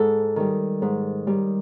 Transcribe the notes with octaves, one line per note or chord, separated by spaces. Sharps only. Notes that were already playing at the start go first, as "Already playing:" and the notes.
Already playing: G#2 A4
D#3 G3
G#2
D#3 G3